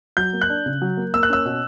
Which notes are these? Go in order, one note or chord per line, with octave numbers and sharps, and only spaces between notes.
F#3 G6
A#3
F#6
D4
C#3
F#3
A#3
A#3 E6
F#6
C#4 E6
B2